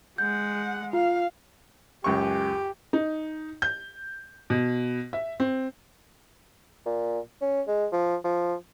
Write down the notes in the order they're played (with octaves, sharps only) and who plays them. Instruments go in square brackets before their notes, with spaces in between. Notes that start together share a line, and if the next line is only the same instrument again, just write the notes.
[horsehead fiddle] G#3 F#5 [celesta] G6
[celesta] F4 [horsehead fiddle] F5
[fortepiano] C#2 F#2 C#6 [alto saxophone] G4
[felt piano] D#4
G6
B2
E5
C4
[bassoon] A#2
C#4
G#3
F3
F3